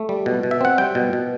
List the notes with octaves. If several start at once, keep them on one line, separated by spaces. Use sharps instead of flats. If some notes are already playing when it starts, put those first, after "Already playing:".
Already playing: A3
G3
B2
B2
E5
C4 F#5
G3 G5
B2
B2